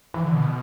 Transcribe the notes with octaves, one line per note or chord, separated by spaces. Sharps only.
E3
D3
B2